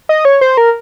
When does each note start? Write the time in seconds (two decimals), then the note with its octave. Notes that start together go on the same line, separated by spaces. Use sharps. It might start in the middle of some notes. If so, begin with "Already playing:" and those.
0.09 D#5
0.25 C#5
0.41 C5
0.57 A#4